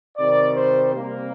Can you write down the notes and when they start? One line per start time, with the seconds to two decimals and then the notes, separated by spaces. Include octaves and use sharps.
0.17 C3 D#3 G3 D5
0.57 C5
0.94 C3 G3 A#3